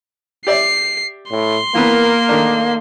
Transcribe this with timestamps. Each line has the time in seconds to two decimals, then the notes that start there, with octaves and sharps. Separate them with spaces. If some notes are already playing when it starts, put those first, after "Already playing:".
0.47 G4 D5 E5 C7
1.32 A2 C6
1.75 E3 A#3 B3 A#4
2.29 D#3 A3 D4